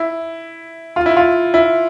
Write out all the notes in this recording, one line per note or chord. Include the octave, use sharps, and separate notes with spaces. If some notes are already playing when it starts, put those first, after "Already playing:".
Already playing: E4
F4
E4
F4
E4